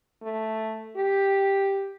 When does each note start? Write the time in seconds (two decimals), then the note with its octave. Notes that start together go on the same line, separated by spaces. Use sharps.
0.22 A3
0.97 G4